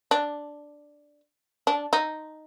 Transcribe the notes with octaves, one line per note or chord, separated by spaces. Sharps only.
D4
D4
D#4